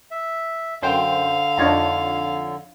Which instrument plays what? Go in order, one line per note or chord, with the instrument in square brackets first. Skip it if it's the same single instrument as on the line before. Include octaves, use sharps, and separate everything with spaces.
[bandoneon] E5
[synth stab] F#2 C5 G5 [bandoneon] D3 [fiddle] F5
[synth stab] F2 F4 C#5 [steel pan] D4 D#4 A#5